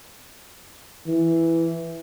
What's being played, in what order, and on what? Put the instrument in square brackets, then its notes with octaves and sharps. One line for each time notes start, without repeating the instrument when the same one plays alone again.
[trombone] E3